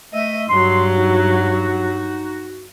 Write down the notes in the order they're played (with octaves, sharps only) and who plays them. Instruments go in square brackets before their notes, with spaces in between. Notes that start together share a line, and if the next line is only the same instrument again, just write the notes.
[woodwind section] A3 E5 [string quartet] D#5
[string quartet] G2 F#3 [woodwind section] C6
[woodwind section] D#4 F#4